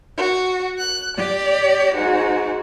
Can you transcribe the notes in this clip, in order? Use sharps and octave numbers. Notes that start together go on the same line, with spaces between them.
F#4
F#6
G4 D5
G#2 F#4